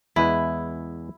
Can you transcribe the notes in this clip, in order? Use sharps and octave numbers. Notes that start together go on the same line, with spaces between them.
E2 G#3 E4 B4